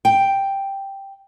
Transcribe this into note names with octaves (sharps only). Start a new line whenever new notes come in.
G5